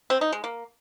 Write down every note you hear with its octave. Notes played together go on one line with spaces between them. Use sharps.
C4
D#4
G#3
A#3